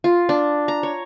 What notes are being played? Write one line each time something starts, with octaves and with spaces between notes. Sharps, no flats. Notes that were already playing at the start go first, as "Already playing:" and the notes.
F4
D4
A#5
C#5